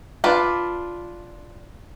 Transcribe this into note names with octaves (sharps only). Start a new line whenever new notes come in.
D4 F4 B4